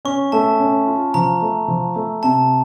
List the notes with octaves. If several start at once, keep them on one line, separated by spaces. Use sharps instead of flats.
C#4 C#6
A3 A5
C#4
F4
F3 A#5
A3
F3
A3
C3 A5